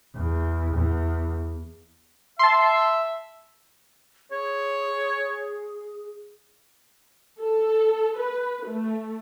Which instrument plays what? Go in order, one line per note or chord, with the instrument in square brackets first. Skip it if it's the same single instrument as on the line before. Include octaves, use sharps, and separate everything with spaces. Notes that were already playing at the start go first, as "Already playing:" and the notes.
[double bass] E2
E2
[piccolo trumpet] E5 [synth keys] A5 C6
[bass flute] G#4 [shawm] C#5
[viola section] A4
B4
A3